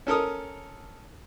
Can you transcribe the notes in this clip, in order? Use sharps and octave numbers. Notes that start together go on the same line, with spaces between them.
C#4 A4 A#4 D#6